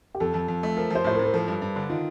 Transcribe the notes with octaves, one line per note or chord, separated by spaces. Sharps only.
G4
F2 A4
F2
F2
A3
F3 A#4
F3 C5
A2 C5
A#4
A2
A#4
F3 A4
G2
G2
D3
D#3 F4